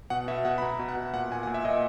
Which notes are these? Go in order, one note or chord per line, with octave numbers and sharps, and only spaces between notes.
B2 F#5
B2 E5
B2 F#5
B5
B2 A#5
B2
F#5
B2
A#2 F#5
A#2 G#5
A#2 F#5
E5
A#2 D#5